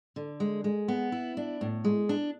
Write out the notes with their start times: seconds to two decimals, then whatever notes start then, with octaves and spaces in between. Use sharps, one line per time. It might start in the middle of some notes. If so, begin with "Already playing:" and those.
0.16 D3
0.40 G#3
0.64 G#3
0.88 B3
1.12 E4
1.37 D4
1.61 A2
1.85 G#3
2.09 D4